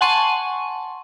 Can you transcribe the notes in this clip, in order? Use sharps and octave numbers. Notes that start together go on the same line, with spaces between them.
F#5 G#5 A5 C6 C#6 D#7